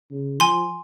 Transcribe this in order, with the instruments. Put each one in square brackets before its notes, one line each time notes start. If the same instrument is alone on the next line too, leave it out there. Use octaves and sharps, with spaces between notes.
[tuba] C#3
[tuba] F3 [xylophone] G#5 C6